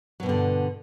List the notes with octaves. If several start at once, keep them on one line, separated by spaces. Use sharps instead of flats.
G2 B2 D3 F#3